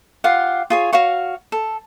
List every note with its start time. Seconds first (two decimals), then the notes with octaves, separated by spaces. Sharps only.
0.24 F4 G4 F5 F#5
0.70 F4 G#4 C#5
0.93 F#4 C#5 F5 C#6
1.52 A4